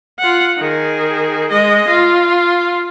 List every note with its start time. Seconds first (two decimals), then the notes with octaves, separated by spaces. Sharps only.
0.19 F4 F#5
0.58 D#3 G#4
1.51 G#3 D#5
1.88 F4